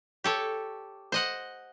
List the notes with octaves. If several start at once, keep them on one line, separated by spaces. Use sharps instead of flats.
G4 A4 C#5
C5 D#5 F#5